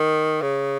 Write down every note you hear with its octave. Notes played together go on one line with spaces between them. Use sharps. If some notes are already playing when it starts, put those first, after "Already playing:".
Already playing: D#3
C#3